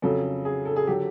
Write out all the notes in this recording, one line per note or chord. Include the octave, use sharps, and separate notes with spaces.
F2 C#3 F#3 A4
G#4
A4
G#4
D3 F#3 G4